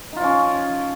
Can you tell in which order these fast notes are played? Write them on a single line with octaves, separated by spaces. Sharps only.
D#4 F4 F3 C#4